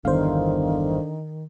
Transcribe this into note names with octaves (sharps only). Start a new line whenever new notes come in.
G1 E2 D3 D#3 C5 F5